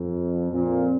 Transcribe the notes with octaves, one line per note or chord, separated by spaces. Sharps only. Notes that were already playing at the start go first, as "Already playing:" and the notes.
Already playing: F2
F2 A#2